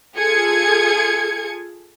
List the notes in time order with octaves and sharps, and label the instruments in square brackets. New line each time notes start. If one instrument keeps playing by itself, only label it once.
[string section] F4 G#4 A4 G#6 C#7